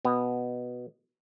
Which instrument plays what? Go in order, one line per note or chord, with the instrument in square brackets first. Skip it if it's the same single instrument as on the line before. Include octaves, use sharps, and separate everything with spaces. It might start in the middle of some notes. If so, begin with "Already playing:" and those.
[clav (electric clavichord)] B2 B3